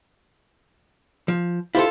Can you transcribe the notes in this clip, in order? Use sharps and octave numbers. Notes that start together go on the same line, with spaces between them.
F3
E4 F4 G4 A4 C5